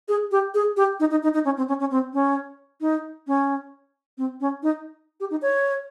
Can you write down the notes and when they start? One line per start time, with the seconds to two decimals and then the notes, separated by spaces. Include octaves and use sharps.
0.08 G#4
0.32 G4
0.54 G#4
0.77 G4
1.00 D#4
1.11 D#4
1.23 D#4
1.34 D#4
1.45 C#4
1.57 C4
1.68 C#4
1.80 C#4
1.91 C4
2.14 C#4
2.81 D#4
3.27 C#4
4.18 C4
4.41 C#4
4.63 D#4
5.20 G4
5.31 D#4
5.42 C#5